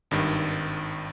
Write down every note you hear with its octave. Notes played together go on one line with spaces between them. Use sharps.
G#1 G2 D#3